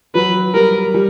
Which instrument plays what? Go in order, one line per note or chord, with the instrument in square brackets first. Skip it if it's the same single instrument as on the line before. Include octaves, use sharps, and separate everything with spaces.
[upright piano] F#3 [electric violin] B4
[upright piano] G3 [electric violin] A#4
[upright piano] G3